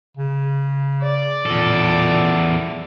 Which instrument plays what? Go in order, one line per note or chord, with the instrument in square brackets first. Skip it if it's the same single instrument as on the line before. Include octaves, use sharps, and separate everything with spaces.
[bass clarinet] C#3
[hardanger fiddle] D5
[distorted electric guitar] E2 A4 [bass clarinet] A#2